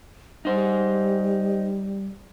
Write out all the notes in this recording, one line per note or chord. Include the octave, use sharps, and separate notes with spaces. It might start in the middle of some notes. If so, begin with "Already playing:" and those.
G3 D#4 C5